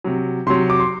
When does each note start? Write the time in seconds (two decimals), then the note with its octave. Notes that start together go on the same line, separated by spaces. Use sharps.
0.04 C3 F#3
0.47 C3 F#3 C6
0.70 D6
0.80 C6